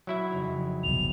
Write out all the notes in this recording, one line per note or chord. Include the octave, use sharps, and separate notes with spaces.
F#3 E4 E5
F2 C#3 D#4
D1 G1 C2 F7